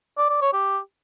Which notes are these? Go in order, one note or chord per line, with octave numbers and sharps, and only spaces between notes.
D5
D5
C#5
G4